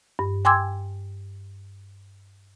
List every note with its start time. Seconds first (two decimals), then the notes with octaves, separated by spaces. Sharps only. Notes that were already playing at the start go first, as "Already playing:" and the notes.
0.19 G2
0.45 G5 G#5 C6 D6 E6 G#6